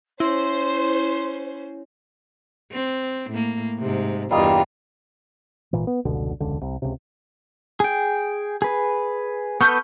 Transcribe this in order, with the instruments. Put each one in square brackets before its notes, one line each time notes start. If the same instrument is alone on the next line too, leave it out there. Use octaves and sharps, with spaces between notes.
[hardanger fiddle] C#4 [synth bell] E4 [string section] C5 [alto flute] C6
[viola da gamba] C4
A2 A#3
G#2 C3
[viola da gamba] E2 G2 F4 [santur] G3 A#3 D#5
[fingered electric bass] G#1 A#2 E3
B3
F1 C#2 B2 D3
E1 C#2 D3
C2
C#2 C3
[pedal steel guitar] G#4 G5
G#4 B4
[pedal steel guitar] B3 A4 B4 [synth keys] C#6 F6 G6